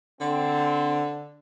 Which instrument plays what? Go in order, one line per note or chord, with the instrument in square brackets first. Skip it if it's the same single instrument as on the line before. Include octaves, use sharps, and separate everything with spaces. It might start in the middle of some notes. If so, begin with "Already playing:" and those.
[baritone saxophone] D3 [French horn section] C4